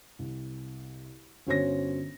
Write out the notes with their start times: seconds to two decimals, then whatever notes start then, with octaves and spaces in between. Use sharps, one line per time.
0.19 C2
1.47 G1 C#4 F#4 C5 C#5 A#6